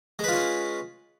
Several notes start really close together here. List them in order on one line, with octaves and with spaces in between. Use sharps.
G#3 B4 F4 C#4